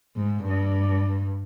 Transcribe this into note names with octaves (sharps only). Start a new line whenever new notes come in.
G#2
G2